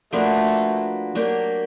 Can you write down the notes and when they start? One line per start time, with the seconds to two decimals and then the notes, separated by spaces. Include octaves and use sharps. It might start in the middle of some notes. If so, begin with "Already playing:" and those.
0.13 F3 A3 A#3 D4 F#4 B4
1.15 F#3 A#3 D4 G4 A#4